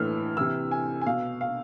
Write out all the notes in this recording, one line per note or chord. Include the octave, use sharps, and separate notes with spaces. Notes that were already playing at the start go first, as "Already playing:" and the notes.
Already playing: A2 E3 E6 F6
C3 E3 E6
G#5
G#5
B2 F5
F5